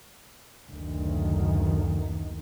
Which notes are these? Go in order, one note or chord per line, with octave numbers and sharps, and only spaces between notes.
F#1 D2 D#3